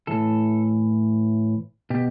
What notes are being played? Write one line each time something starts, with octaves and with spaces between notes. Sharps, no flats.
A2 E3 A4
B2 G4